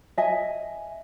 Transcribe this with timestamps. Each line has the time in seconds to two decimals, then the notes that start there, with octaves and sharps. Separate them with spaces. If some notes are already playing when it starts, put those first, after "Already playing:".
0.18 D#5 E5 G#5